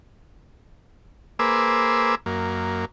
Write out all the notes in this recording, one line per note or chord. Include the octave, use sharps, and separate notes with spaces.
A#3 G#4 B4 C5 D6 E6
F#2 A#3